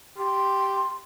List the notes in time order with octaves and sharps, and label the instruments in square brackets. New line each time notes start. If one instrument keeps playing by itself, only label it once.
[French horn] G4 [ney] C6